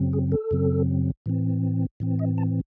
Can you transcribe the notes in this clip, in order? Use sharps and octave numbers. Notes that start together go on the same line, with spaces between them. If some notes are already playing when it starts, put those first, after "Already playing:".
Already playing: F#2 C#3 F#3 C4
G#4
A4
F#2 C#3 F#3 C4
A2 E3 C4
A2 E3 C4
D#5
A5